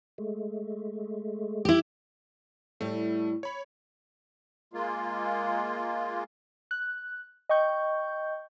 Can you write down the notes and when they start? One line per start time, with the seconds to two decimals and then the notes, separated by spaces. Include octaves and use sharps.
0.18 G#3 A3
1.65 E4 G4
2.81 A2 G3 A3
3.43 C#5 B5
4.73 G#3 A#3 F4
6.71 F#6
7.49 D#5 G5 C#6 G6